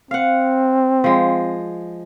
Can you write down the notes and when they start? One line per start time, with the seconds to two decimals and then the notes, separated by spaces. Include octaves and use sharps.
0.11 C4 F5 F#5
1.04 F3 G#3